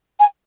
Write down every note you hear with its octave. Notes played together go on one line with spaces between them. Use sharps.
G#5